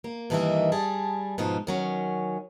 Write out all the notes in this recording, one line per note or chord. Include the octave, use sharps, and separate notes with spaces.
A#3
G2 D#3 E3 A#3 D#5 E5
G3 G#4 A5
G#2 B2 F3 D#4
D#3 F#3 C#4